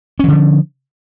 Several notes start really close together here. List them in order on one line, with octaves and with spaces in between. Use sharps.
C#4 E3 D3 F3